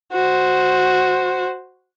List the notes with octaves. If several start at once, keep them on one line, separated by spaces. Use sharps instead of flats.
F#4 C5